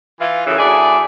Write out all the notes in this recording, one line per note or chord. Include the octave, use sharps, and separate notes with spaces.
E3 F4
F#2 A2 C#3 E3
D2 E4 G#4 D5